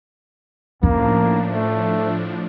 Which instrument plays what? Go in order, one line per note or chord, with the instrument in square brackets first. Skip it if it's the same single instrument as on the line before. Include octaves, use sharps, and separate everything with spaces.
[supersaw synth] A2 F3 D4 [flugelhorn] A#3 [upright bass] C#4 E4
[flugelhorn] A3